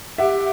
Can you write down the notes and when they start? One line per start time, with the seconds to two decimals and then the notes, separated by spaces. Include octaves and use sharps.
0.18 G4 E5 F#5